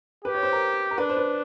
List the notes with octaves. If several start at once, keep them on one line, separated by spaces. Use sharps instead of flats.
G4 B4
C#5
C5
A#4
A#4
D4 B4
C5
B4